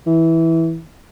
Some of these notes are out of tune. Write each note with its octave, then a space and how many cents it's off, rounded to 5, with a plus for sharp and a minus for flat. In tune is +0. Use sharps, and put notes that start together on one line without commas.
E3 -10